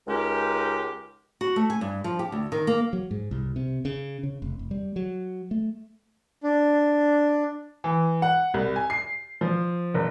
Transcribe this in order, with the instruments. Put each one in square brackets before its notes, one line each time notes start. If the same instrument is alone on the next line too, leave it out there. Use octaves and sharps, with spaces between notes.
[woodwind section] C#2 G#3 C#4 D#4 G4 A#4
[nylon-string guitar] F#4
A3
G#5
G2
F3
G4
D2
D#3
A#3
[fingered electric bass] F#3
G#2
C2
C3
C#3
C#3
F1
F1
G3
F#3
A3
[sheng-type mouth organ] D4
[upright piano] E3
F#5
C2
G#5
C7
F3
F#1